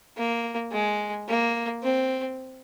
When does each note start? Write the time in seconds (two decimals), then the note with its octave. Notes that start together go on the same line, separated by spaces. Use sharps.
0.17 A#3
0.72 G#3
1.28 A#3
1.84 C4